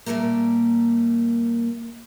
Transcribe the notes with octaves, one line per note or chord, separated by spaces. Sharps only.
A#2 D#3 G3 A3 A#3